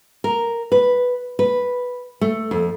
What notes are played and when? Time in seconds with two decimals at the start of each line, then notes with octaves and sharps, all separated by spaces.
0.24 A#4
0.72 B4
1.39 B4
2.21 A3
2.51 F2